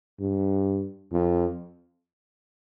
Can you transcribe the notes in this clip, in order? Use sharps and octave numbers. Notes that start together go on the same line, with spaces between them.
G2
F2